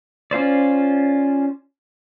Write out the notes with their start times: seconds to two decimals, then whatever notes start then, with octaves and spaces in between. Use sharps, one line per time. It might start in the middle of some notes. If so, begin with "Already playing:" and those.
0.31 C#4 F4 C5 D5